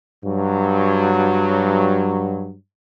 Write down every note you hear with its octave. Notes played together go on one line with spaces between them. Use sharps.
G2 F#3